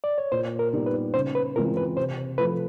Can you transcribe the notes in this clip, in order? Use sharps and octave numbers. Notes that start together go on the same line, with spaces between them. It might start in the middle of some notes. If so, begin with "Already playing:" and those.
D5
C#5
A#2 C5
A#4
G3 B3 D#4
B4
C#3 C5
B4
E3 G#3 C4 F4 A#4
B4
C3 C5
F3 A3 B4